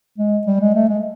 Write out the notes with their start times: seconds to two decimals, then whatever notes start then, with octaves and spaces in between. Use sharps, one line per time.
0.18 G#3
0.46 G3
0.60 G#3
0.75 A3
0.89 G#3